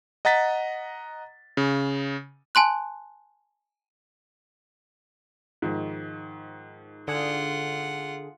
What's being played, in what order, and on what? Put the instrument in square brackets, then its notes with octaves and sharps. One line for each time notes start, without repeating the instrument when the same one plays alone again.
[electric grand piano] D#5 F#5 A#5 A6 B6
C#3
[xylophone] G#5 A5 C6 F#6
[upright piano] G#2 D#3 F3
[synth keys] D3 G#4 [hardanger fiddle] F4 F#5